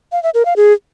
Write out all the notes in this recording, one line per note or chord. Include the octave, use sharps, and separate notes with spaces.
F5
E5
A#4
F5
G#4